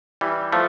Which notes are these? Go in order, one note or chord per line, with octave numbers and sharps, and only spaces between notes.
E3 G3
F3 A3